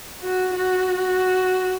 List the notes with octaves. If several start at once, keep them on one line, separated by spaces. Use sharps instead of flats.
F#4
F#4